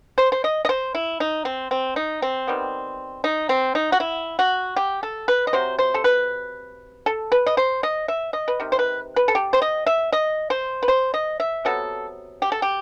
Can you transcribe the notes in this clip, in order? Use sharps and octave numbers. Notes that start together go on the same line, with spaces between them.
C5
C5
D#5
D#5
C5
E4
D#4
C4
C4
D#4
C4
D#3 G3 B3
D#4
C4
D#4
F#4
E4
F#4
G4
A4
B4
D#5
C3 F#3 C5
C5
A4
B4
A4
B4
D#5
C5
D#5
E5
D#5
B4
C3 D#3
C5
B4
B4
A4
G4
C5
D#5
E5
D#5
C5
B4
C5
D#5
E5
C3 F#3 B3 A4
G4
A4
G4